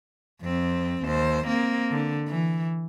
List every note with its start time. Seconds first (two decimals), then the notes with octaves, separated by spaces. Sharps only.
0.41 F2 C4
1.04 D#2 C5
1.47 A#3 C4
1.91 D3
2.28 E3